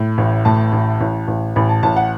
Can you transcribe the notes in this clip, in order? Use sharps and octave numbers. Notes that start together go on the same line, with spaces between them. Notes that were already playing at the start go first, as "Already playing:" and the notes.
Already playing: A2
A1
A2 A5
A1
A1
A1
A1 B5
A5
A1 A5
F#5